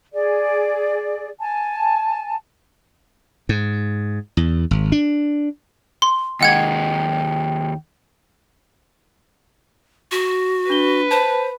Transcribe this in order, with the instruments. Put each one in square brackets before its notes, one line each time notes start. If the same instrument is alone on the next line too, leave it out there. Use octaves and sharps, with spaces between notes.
[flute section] G#4 D5
G#5 A5
[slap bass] G#2
E2
G#1
D4
[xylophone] C6
[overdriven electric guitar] D#2 G#3 [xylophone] D#5 F#5 G#6 [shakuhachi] G5
[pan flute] F#4
[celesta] D4 G7 [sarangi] B4
[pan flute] C5 [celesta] A5